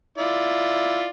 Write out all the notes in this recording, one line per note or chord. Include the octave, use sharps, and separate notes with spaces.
E4 F4 D5